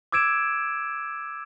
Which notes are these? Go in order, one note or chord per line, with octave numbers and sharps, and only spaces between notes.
D6 E6 G#6 D7 E7